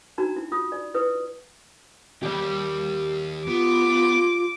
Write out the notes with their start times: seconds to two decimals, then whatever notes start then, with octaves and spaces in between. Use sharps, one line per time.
0.18 D4 D#4 F#4 A#5
0.37 E4
0.52 F4 D#6
0.72 D5
0.94 E4 B4 D#6
2.23 D#2 G4 D5
3.47 B3 F4 D6